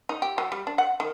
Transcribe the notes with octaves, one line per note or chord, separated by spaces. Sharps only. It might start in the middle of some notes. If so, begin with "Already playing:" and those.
D#4
G4
F#3
G3
D4
F#5
D#3